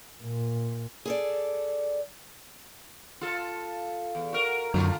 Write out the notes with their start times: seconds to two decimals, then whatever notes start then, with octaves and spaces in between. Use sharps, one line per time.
0.23 A#2
1.05 G#4 A4 D5
3.21 F4 A4
4.15 E2
4.33 F#4 A#4
4.74 F#2 D3 A3 F4